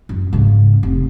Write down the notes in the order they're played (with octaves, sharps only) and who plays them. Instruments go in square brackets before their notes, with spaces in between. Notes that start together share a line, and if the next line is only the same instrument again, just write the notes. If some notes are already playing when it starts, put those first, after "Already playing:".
[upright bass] F#2
G#2 C#3
F1